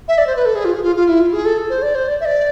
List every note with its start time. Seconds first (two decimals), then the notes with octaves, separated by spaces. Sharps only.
0.08 E5
0.18 D5
0.27 C5
0.36 B4
0.45 A4
0.55 G#4
0.65 F4
0.74 G#4
0.83 F4
0.96 F4
1.08 E4
1.20 F4
1.33 G#4
1.45 A4
1.70 C5
1.82 D5
1.95 C5
2.08 D5
2.21 E5
2.25 D5